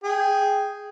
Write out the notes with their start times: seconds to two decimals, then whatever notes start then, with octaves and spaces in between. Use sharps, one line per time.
0.04 G#4 G5